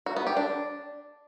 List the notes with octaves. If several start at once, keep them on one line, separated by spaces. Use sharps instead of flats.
F#4
B3
G4
D4